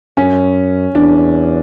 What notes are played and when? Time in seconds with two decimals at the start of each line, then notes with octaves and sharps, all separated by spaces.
0.17 F#2 C#4
0.95 E2 D4